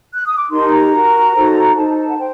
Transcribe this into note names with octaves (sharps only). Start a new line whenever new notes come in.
F#6
D#6
D6
D#4 G4 A#4 C6
A5
A#5
F#4 A#4
D#4 F#4 A4 C5
D#4 A4 C5 A5
A5
F#5
C5 G5